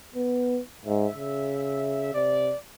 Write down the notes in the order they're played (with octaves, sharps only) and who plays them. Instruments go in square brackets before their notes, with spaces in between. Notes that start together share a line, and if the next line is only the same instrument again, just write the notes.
[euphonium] B3
[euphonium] G#2 [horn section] E5
[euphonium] C#3
[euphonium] C3 [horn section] D5